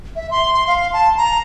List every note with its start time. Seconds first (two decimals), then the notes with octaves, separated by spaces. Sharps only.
0.16 E5
0.31 C6
0.54 C6
0.68 F5
0.93 A5
1.18 A#5